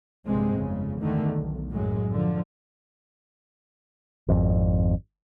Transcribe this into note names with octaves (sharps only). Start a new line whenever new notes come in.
A#1 G2 C3 G#3 C4
G1 F2 C#3
E2 D3 D#3 A3
B1
F#2 A2 F#3 G#3
D3 F3
G#1 F2